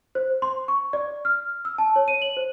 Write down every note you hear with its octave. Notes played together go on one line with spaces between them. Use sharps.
C5
C6
C#6
D5
F6
E6
A5
C#5
D#7
F#7
C5